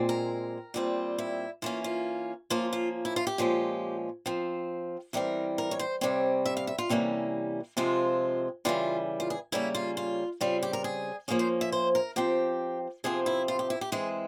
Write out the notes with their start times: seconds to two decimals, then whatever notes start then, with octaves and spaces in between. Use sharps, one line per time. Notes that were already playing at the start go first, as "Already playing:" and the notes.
Already playing: A#2 G#3 C4
0.09 A#4
0.74 A#2 G3 C4
1.18 E4
1.62 E3 A#3 C#4 F4
1.84 F4
2.50 F3 A#3 C#4 F4
2.73 F4
3.05 E4
3.16 F4
3.27 G4
3.38 A#2 F3 G#3 C#4
4.26 F3 C4
5.13 E3 G3 C4 A#4
5.58 A#4
5.71 C#5
5.79 C5
6.01 C3 G3 C4 C#5
6.46 E5
6.57 F5
6.67 E5
6.78 F4
6.89 C3 E3 G3 A#3 C#4
7.77 C3 F3 G#3 C4 F4
8.65 C#3 E3 G3 F4
9.20 F4
9.30 G#4
9.52 C#3 G3 A#3 C#4 E4
9.75 F4
9.97 F4
10.41 C#3 G3 C4 F4
10.63 G4
10.73 A#4
10.84 G#4
11.28 F3 A#3 C#4 G#4
11.39 C5
11.61 E5
11.72 C5
11.95 A#4
12.16 F3 C4 G4
13.04 C3 F3 C4 G#4
13.26 E4
13.48 F4
13.59 G4
13.70 E4
13.81 G4
13.92 E3 G#3 C4 G#4